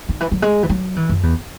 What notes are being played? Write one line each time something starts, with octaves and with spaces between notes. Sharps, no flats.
D#3
E3
F#3
G#3
E3
F#3
E3
F#2
E2